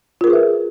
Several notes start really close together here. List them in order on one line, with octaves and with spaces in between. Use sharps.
F4 A#4 G#4 B4 E5